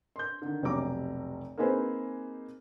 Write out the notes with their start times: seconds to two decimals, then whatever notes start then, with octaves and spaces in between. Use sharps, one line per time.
0.16 C6 G6
0.42 D3 D#3
0.63 F1 B1 C3 C#5 A#5 D6
1.57 A#3 C4 D#4 G#4 B4 C5